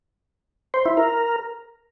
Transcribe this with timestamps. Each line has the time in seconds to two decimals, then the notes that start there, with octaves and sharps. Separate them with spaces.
0.74 C5
0.86 E4
0.97 A#4